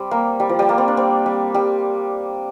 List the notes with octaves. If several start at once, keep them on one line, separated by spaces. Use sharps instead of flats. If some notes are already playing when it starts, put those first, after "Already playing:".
Already playing: G3 C4
A#3
G3
F3
G3
A#3
C4
D4
C4
G3
G3